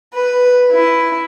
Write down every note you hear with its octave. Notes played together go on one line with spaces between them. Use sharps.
B4
E4